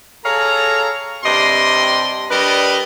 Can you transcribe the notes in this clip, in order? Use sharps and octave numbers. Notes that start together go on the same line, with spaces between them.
G#4 A4 C#5 F5 A#5
G2 C3 D5 D#5 C6
G3 D4 A#4 B4 D5 D#5